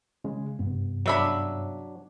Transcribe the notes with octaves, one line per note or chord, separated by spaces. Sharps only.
C#3 G#3
G2 C3 B3
C#3 F#3 D4 E5 B5